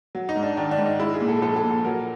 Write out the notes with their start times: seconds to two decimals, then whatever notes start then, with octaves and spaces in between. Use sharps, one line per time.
0.15 F#3
0.29 D#4
0.36 G#2
0.43 D4
0.57 D#3 D4
0.71 D4
0.78 G#2
0.86 D#4
0.99 G#3 E4
1.14 G#4
1.21 A#2
1.28 A4
1.42 F3 A4
1.56 A4
1.63 A#2
1.71 A4
1.84 F#3 A#4